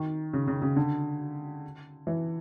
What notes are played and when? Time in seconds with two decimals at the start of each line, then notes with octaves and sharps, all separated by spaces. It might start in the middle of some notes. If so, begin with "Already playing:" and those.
Already playing: D#3
0.33 C#3
0.48 C#3
0.62 C#3
0.76 D3
2.07 E3